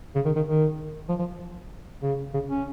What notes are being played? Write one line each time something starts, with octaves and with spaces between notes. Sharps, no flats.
C#3
D#3
D#3
D#3
F3
F3
C#3
C#3
C#4